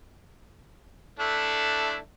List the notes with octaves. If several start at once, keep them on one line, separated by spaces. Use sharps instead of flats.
A3 D4 E4